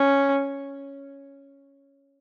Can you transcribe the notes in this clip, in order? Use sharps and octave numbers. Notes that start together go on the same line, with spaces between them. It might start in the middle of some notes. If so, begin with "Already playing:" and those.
Already playing: C#4